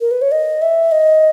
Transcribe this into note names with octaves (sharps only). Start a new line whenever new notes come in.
A#4
B4
C#5
D#5
E5
D#5